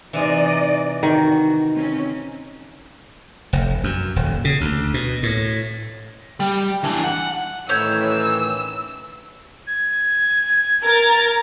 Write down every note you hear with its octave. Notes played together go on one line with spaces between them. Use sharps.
C3 E3 D#4 D5 D#5
D#3 F#4
C4 C#4
F1
F#2
D#1
C#3
D2
B2
A2
G3
E3 D4
F#5
A2 D#3 E3 C#4 C#5 E6 G6
G#6
A#4 A6